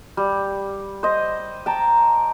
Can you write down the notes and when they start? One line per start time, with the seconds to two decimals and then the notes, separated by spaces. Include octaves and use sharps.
0.17 G3
1.03 C5 D#5
1.66 G5 A5 A#5